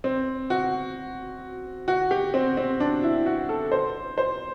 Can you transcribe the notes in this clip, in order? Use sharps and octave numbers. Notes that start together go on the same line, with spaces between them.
C4
F#4
F#4
G4
C4
C4
D4
E4
F#4
A4
C5
C5